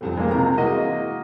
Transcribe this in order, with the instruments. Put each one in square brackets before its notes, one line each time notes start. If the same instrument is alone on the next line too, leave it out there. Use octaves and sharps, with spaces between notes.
[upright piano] F1 C2 F2
[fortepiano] G#3 A#3
[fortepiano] C2 C3 [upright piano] A#4 A#5
[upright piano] E3 G#3 E4 [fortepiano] A#3 F#4 D#5